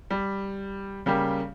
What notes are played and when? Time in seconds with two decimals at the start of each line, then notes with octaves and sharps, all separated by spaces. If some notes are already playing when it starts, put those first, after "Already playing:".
0.11 G3
1.06 C#3 G3 A#3 G4